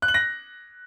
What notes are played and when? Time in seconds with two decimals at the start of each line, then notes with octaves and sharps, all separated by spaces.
0.02 F#6
0.08 F#7
0.14 A#6